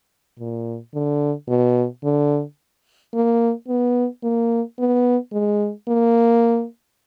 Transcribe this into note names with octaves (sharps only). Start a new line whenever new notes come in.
A#2
D3
B2
D3
A#3
B3
A#3
B3
G#3
A#3